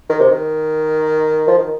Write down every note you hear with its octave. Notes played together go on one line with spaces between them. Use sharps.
D#3
C3
D#3
F3
D#3